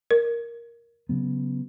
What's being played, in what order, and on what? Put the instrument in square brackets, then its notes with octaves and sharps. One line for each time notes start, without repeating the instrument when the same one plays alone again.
[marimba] A#4
[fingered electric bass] C#3 F#3 B3